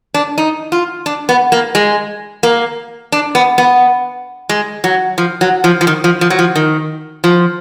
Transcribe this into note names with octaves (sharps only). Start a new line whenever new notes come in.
D4
D#4
F4
D4
B3
A#3
G#3
A#3
D4
B3
B3
G#3
F#3
F3
F#3
F3
F3
D#3
F3
F3
F#3
F3
D#3
F3